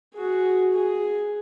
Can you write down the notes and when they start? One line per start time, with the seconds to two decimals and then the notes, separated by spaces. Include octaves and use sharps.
0.15 F#4 G#4
0.73 G#4